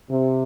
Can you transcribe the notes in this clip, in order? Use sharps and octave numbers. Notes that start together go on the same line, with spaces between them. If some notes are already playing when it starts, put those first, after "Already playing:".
C3